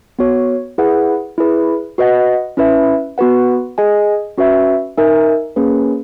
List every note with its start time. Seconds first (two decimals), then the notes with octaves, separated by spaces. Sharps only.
0.19 B3 F#4 C#5
0.78 E4 G#4 B4 F#5
1.38 E4 G#4 B4
1.98 F#4 B4 D#5 F#5
2.57 C#4 E4 B4 E5
3.18 B3 F#4 B4 F#5
3.78 G#4 D#5 G#5
4.37 C#4 F#4 B4 E5
4.97 D#4 A#4 E5 G#5
5.56 A#3 C#4 G#4 B4